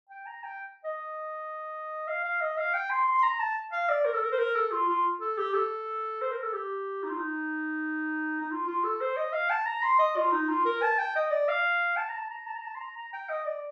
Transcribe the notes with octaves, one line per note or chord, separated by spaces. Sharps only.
G5
A#5
G5
D#5
F5
F5
D#5
F5
G5
C6
C6
C6
A#5
A5
F5
D5
A#4
A4
A#4
C5
A#4
A4
F4
F4
A4
G4
A4
C5
A#4
A4
G4
D#4
F4
D#4
D#4
F4
F4
A4
C5
D#5
F5
A5
A#5
C6
D#5
F4
D#4
F4
A#4
A5
G5
D#5
D5
F5
A5
A#5
A5
A#5
A5
A#5
A5
C6
A#5
A#5
G5
D#5
D5